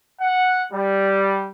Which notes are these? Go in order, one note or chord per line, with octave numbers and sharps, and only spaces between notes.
F#5
G3